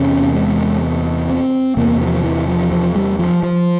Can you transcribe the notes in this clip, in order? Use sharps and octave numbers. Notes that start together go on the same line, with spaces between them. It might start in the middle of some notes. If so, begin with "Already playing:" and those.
Already playing: E2 C3 C#4
G#3
C4
E2 C3 A#3
F3
E3
F3
F3
G3
F3
F3